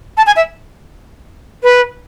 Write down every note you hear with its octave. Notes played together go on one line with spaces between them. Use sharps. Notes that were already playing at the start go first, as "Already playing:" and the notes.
A5
G#5
E5
B4